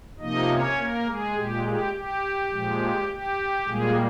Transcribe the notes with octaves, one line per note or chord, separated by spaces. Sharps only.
C3 F3 A#3 D#4 D#5
C#4 C#5
A#3 A#4
G#3 G#4
A#2 G#3 G4
G4
G4
A#2 F3 G#3
G4
A#2 G3 G#3 A#3 G#4